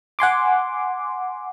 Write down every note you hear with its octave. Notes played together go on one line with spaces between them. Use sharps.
F#5 G#5 C6 D6